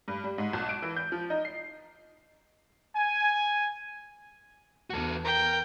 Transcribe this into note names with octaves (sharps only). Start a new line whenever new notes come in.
G2
G3
G#2
B1
D7
E3
G6
F3
D#4
C7
G#5
E2 F#4 A4
A#4 G5